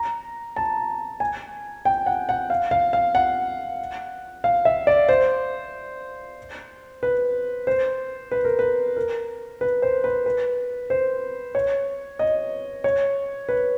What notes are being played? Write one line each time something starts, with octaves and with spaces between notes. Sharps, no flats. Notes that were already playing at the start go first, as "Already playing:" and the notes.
Already playing: A#5
A5
G#5
G5
F#5
F#5
F5
F5
F5
F#5
F5
E5
D5
C5
B4
C5
B4
A#4
B4
A#4
B4
C5
B4
B4
C5
C#5
D#5
C#5
B4